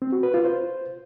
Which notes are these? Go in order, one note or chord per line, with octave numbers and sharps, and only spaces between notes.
C4
F#4
B4
F4
C5